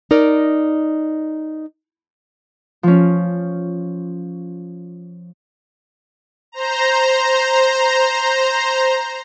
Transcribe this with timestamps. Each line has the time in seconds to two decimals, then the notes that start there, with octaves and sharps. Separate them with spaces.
0.11 D#4 A#4 D5 D#5
2.83 F3 C#4
6.52 C5 A#5